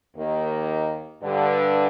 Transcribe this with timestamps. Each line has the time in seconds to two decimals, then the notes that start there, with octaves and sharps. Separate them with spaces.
0.17 D#2 D#3 A#3
1.23 G2 D3 G3